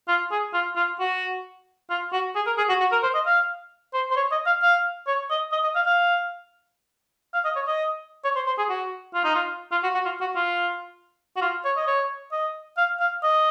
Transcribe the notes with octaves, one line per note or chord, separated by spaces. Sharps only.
F4
G#4
F4
F4
F#4
F4
F#4
G#4
A#4
G#4
F#4
F#4
A#4
C5
D#5
F5
C5
C5
C#5
D#5
F5
F5
C#5
D#5
D#5
D#5
F5
F5
F5
D#5
C#5
D#5
C#5
C5
C5
G#4
F#4
F4
D#4
F4
F4
F#4
F#4
F4
F#4
F4
F#4
F4
C#5
D#5
C#5
D#5
F5
F5
D#5